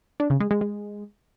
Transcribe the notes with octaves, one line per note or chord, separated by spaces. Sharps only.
D4
C#3
G#3
G#3
G#3